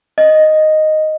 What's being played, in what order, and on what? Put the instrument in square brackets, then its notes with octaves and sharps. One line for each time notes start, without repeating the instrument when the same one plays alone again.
[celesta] D#5